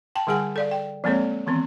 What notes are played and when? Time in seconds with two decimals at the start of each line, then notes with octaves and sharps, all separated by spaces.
0.15 G5 A5
0.27 D3 G3 G#4 F#5 G#5
0.56 A4 D5 F5
0.71 G5
1.04 F3 G#3 A#3 C4 A4 C#5
1.47 D#3 E3 B3 C4